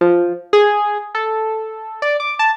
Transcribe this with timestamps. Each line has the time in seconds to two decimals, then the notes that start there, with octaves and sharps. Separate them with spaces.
0.01 F3
0.53 G#4
1.15 A4
2.02 D5
2.20 D6
2.39 A5